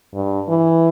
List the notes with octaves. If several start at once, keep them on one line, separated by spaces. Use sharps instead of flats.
G2
E3